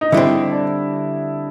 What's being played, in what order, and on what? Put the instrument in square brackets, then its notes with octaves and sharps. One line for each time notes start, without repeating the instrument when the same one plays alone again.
[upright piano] D#4
[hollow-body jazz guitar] D3 G3 C4 [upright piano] E4
[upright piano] D4